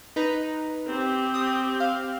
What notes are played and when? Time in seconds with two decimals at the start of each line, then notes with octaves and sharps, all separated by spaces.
0.16 D#4 B4 A#5
0.88 C4 G4
1.34 D#6
1.80 F5